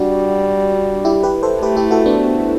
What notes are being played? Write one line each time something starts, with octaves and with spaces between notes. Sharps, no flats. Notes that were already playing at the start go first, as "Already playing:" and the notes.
Already playing: G3 D4 F#4
E4 G4
G4 B4
A4 C5
A3 G4 B4
E4 G4
F#4 A4
B3 D4